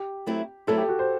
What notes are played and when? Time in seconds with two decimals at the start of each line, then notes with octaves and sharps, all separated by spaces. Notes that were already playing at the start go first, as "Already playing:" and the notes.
Already playing: G4
0.26 F#3 A3 C4 E4 B4
0.67 F#3 A3 C4 E4 A4 B4
0.78 G4
0.89 F#4
0.99 C5